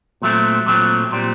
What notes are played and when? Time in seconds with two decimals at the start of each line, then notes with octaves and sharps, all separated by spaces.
0.22 A#2 F#3 A3 C4
0.66 A#2 F#3 A3 C4
1.12 A#2 G3 C4